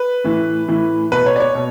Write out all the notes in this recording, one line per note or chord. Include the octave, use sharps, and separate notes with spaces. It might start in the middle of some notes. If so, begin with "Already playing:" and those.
Already playing: B4
A2 E3
A2 E3
B2 B4
C#5
D5
C#5
B2